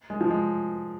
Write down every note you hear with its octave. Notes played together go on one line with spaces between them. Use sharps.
G#3
F3
G#3